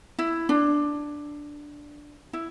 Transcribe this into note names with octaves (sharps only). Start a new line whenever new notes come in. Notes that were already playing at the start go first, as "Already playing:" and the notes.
E4
D4
E4